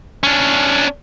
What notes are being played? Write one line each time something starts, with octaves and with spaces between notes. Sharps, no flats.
C#4 D4